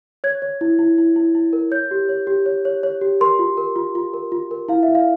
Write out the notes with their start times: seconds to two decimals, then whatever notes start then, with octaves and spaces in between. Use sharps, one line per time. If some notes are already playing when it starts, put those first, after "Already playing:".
0.24 C#5 G#6
0.42 C#5
0.61 E4
0.79 E4
0.98 E4
1.16 E4
1.35 E4
1.53 A#4
1.71 C#5 G6
1.91 G4
2.09 C#5
2.27 G4
2.46 C#5
2.65 C#5
2.83 C#5
3.01 G4
3.21 A#4 C6
3.39 F4
3.57 A#4
3.76 F4
3.95 F4
4.14 A#4
4.32 F4
4.51 A#4
4.69 E4 F5
4.83 E5
4.88 E4
4.95 F5